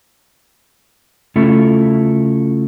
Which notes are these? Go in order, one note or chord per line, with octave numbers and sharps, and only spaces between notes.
C#3 A3 C#4 E4 F4 A4